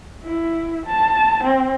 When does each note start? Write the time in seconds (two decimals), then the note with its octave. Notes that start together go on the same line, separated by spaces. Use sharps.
0.24 E4
0.86 A5
1.44 C4